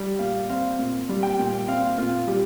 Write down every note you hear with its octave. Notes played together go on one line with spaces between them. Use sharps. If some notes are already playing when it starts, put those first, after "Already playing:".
Already playing: G3
A#2 F5
C4 F5
A#2
G3
G5
A#2
C4 F5
A#2 F4
G3 G4